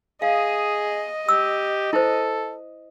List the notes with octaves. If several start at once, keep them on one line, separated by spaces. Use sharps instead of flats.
G#4 D#5 F5
G4 E6
E4 A4 C5